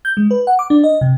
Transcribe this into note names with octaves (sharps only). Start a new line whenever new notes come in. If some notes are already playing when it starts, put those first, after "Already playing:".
G6
G#3
B4
F#5
D6
D4
D#5
C3